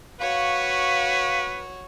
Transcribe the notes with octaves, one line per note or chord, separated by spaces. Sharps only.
F#4 B4 C#5 F5